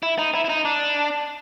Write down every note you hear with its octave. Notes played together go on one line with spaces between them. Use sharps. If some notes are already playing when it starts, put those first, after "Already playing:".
E4
D#4
E4
E4
D#4
D4